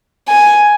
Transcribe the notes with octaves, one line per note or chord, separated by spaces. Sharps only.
G#5